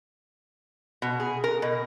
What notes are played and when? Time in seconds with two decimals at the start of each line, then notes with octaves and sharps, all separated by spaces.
1.02 B2
1.20 G#4
1.44 A#4
1.62 B2